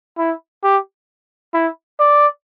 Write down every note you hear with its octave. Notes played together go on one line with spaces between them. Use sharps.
E4
G4
E4
D5